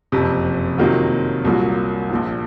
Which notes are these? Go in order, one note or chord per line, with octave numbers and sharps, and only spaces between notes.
F#1 F2 C3
C3 D#3 F#3 A#3 F4
C2 A#2 F#3 A#3 F4
A#1 A#2 F3